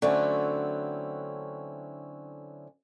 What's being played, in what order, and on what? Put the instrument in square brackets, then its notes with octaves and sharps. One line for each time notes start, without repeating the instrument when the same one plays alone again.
[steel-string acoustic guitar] D3 F#3 A3 C4 C#4 E4